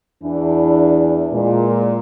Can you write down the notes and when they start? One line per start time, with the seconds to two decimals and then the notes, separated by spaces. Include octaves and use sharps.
0.24 E2 E3 D4
1.32 A#2 G#3